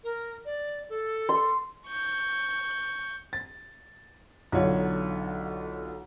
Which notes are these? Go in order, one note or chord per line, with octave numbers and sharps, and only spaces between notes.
A#4
D5
A4
C6
C#6 G6
A6
B1 D3 F4 C#5 F#5